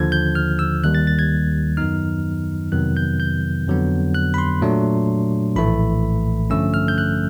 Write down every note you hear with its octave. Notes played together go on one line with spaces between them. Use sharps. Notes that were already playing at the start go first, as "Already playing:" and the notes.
Already playing: D#2 D3 F3 G#6
G6
F6
E6
D#2 D#3 G3 F#6
A6
A6
G#6
F#2 D#3 F#3 B3 D#4 F6
F2 C3 D#3 F#3 B3 F#6
G6
G6
F2 D3 F#3 B3
F#6
B5
C6
A#2 F#3 A3 D4
A#1 A2 E3 A3 B5
G2 D3 F3 A3 C#4 E6
F6
G6
F#6